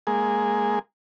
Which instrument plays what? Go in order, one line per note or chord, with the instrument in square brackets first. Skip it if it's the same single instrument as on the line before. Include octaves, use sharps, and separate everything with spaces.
[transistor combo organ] G#3 A#3 G#4